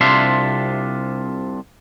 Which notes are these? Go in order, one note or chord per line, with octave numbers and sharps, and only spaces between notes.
C2 C3 D4 F4 E5 C6